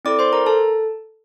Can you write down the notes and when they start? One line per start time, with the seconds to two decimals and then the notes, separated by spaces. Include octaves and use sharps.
0.05 C4 E4 A4 D5 D6
0.19 C5 C6
0.33 A#4 A#5
0.46 A4 A5